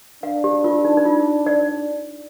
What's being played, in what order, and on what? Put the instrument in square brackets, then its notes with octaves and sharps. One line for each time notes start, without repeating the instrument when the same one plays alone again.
[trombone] D4 [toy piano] F5
[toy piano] G4
F4
D#4
D#4
F4
D5